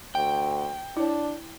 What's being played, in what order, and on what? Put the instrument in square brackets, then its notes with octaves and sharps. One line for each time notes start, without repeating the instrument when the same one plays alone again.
[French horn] D2 [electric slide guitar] G5
[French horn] D4 [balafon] E4 C#5